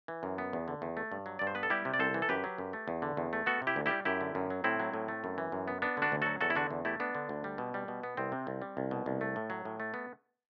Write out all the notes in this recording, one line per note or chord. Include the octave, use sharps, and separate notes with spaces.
E3
F#2
B3
E2
D3
E2
A3
G2
F#3
G2 D5
C5
B3 B4
A4
G3 E4 G4
C3
D5
C2 A4 C5
E3
A4
F#2 G4 B4
F#3
F#2
A3
E2
D3
E2
A3
B3 F#4 A4
C3
E4 G4
D2
G3 E4 G4
F#2 E4 G4
D3
F#2
F#3
A2 C4 E4
F#3
A2
A3
F#2
E3
F#2
B3
B3 D4
D3 D4 F#4
D2
F#3 F#4 A4
E2 F#4 A4
E4
D3 D4 F#4
E2
A3 E4 G4
B3 D4
D3
D2
G3
B2
G3
B2
B3
C2 C4
C3
C2
G3
C2
B2
C2
A3
A2
F#3
A2
A3
B3